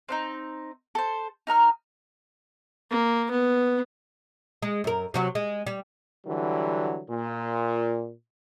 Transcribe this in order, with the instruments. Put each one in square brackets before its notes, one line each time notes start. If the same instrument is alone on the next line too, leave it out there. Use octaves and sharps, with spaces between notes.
[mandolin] C4 D4 D#4
A4 C5
D#4 A#4 A#5 F6
[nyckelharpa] A#3
B3
[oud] G#3
F#2 A#4
C3 F#3 F#4
G#3
G3
[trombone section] D3 E3 F#3 G3
A#2